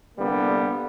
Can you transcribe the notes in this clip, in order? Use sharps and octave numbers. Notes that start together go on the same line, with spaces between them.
C2 D3 G3 A#3 B3